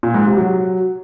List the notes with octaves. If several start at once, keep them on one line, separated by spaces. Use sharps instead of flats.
A#2
G#2
C3
F#3